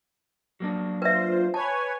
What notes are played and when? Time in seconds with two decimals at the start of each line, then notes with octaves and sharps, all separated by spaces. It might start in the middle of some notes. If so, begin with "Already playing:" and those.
0.60 F#3 A#3 D4
1.02 F4 B4 C5 E5
1.54 B4 C#5 G#5 A5